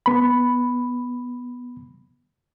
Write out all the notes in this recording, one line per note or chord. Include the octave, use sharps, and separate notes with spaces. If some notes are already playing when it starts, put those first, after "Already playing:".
B3 B5